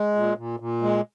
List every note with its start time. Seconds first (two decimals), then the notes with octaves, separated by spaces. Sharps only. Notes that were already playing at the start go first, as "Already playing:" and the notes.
Already playing: G#3
0.15 A#2
0.37 A#2
0.60 A#2
0.82 G#3